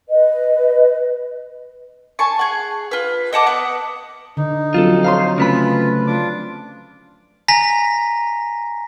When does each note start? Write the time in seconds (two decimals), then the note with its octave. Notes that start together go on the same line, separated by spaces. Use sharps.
0.08 B4 D#5
2.19 G#5 A5 C#6
2.39 G#4 F#5
2.91 F4 B4
3.33 D#5 F#5 A5 D6
3.46 B3 F#5
4.37 D3 D#4
4.74 F3 F#3 C4 F4 A4
5.04 C5 C#5 F5 A#5 C6
5.38 C#3 A3 C#4 F4 B4 B5
6.07 D4 F4 D6
7.48 G#5 A#5 A#6 B6